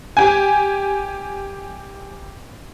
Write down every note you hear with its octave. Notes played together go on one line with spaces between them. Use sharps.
G4 G#5